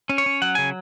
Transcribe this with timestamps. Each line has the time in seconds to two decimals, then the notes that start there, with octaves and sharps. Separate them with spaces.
0.09 C#4
0.18 C#5
0.26 C#4
0.42 F#3 F#5
0.55 C#3 G#5